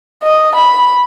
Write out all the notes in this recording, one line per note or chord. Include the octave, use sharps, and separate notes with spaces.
D#5
B5